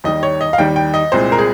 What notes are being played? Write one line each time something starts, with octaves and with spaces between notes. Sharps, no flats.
D#2 D#3 G3 D#5
C#5
D#5
F5
D#2 D#3 G3 G5
G5
D#5
C2 A#2 G#3 C4 C5
A#4
G#4